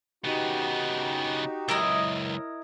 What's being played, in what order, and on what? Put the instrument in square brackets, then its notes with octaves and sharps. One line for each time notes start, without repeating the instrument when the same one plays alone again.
[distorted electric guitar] C#3 B3 [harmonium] D#4 F#4 G4
[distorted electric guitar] C#2 F#2 [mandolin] E4 A#4 D#5